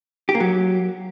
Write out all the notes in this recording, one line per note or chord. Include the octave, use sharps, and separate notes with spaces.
G4
A#3
F#3